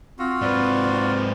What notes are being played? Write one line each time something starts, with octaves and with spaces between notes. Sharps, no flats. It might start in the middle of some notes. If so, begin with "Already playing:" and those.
C4 F4 F#4 A#6
G#2 C4 B4 D5